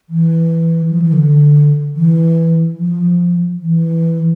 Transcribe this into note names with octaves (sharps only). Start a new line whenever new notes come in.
E3
F3
E3
D3
E3
F3
E3